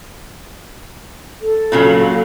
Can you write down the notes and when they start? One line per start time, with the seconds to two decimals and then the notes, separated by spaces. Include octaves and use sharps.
1.42 A4
1.72 A#2 C#3 F#3